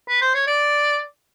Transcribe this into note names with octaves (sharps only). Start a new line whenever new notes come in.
B4
C5
C#5
D5